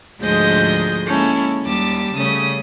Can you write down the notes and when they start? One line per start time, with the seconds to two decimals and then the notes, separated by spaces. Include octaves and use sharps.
0.19 D2 G#2 F3 G#3 D#5 G6
1.07 G#3 A#3 C#4 E4 A4
1.63 D#2 G3 A5 D6
2.15 C#3 G3 A3 C#4 D#6